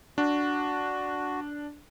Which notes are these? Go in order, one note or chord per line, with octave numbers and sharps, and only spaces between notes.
D4 F#4